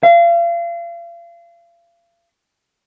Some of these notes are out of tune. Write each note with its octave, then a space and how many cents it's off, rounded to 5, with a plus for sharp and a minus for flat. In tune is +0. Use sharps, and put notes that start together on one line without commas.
F5 -35